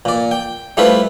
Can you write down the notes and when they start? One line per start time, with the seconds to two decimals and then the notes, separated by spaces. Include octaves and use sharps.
0.05 A#2 D5
0.31 G5
0.77 G3 A3 E4 F4 B4 C5